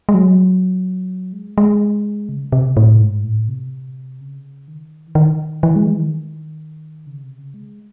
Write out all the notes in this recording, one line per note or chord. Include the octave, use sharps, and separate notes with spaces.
G#3
F#3
G#3
G#3
C#3
C3
A2
G#2
A2
C3
C#3
D#3
E3
D#3
E3
G#3
E3
D#3
C#3
C3
C#3
G#3